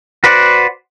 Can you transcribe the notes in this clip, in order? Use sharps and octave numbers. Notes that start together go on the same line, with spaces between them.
F#4 B4 C5 D5 F#5